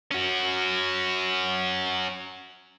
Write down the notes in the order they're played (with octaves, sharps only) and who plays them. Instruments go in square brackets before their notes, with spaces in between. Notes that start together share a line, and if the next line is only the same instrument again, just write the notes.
[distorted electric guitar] C#4 F#4